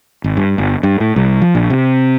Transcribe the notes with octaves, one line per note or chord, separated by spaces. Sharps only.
G#1
G2
G1
G2
A2
C2
F3
A#1
C3